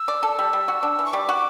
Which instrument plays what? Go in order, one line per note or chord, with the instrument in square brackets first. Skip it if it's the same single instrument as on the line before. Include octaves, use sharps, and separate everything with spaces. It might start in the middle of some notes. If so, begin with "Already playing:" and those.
Already playing: [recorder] E6
[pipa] D5
A4
G3
G3
F#4
D4
E3
[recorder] C#6
[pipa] G3 [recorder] D6
[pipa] F#4